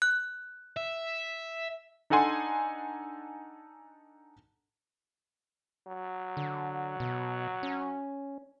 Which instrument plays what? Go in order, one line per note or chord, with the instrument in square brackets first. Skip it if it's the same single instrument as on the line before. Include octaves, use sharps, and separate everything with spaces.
[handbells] F#6
[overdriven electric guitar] E5
[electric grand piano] D4 D#4 A4 F#5 G#5 C6
[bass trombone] F#3
[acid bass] D3
B2
C#4